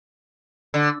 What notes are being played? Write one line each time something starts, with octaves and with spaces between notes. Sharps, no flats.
D3